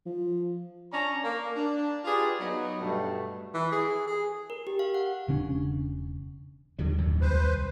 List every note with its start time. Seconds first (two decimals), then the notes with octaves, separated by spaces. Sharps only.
0.06 F3
0.92 C#4 D4 C#5 D5 A5 A#5
1.23 A#3
1.56 D4
2.05 F4 G4 G#4 B4 D5
2.40 F#3 B3 D#4
2.80 G2 B2 A3
3.54 E3
3.72 G#4
4.07 G#4
4.50 A#4
4.67 G4
4.79 F5
4.94 F#5
5.28 E1 C#3 C#4 D4
6.79 D#2 D3 F#3 G3
6.98 D1 F#2 D#3
7.21 C2 B4 C5